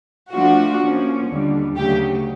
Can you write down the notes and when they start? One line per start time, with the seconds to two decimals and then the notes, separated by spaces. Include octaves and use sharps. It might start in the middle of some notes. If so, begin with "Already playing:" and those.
0.34 F3 A3 D4 F4 F#4
0.82 F3 A#3 C#4
1.30 D#2 D3 G3
1.77 D2 C#3 F#3 A3 G4